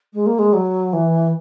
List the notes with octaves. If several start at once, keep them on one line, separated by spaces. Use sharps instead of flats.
G#3
A#3
G#3
F#3
E3